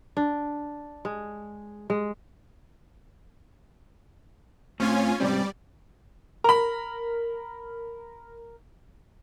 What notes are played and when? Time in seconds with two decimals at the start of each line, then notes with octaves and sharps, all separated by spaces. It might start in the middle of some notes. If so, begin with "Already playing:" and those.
0.17 D4
1.05 G#3
1.90 G#3
4.80 A2 C4 C#4 F4 G#5
5.20 G#2 C3 G3 C4 D5
6.44 A#4 A#5 B5